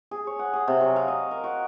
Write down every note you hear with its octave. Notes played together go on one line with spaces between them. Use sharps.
G#4
C#5
F#5
G#4
C3
F#3
F5
D#5
A#4
F#4